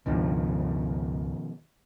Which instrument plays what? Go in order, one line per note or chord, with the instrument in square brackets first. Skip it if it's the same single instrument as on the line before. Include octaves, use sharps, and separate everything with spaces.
[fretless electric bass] C#2 G2 D4 [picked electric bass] B2 D#3 F3